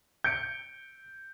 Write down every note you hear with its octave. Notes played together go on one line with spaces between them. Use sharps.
G6 C#7 D7